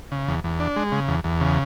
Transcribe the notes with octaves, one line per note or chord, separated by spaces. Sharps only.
C#3
E2
E2
D4
G#3
C#3
E2
E2
C#3